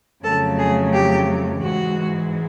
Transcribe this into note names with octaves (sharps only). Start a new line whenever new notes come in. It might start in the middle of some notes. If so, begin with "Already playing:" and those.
F2 C#3 F#3 A3 A4
G#4
G4
G#2 E3 G#3 F#4